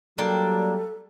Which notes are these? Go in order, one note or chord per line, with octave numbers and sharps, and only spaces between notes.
F#3 G3 A#3 D4 A4 G5